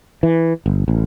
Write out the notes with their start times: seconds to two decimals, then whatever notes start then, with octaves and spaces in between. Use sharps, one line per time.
0.23 E3
0.66 G1
0.88 A1